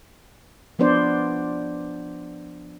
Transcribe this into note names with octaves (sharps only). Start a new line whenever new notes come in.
F3 B3 D4 C5 D5